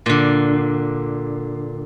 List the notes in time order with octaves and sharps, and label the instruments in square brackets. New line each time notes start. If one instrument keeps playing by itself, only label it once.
[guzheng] A#2 D3